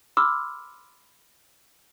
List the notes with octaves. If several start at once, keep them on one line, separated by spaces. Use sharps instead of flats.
B5 C6 D6 E6 F6